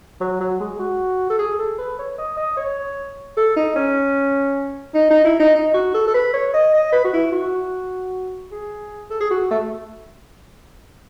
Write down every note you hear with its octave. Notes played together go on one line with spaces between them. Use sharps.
F#3
F#3
G#3
F#4
A4
G#4
A4
B4
C#5
D#5
D#5
C#5
A4
D#4
C#4
D#4
D#4
E4
D#4
D#4
F#4
A4
A4
B4
C#5
D#5
D#5
B4
F#4
E4
F#4
G#4
A4
G#4
F#4
A3